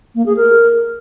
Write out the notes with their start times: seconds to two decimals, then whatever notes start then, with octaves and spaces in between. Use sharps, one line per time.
0.15 A#3
0.26 G#4
0.37 A#4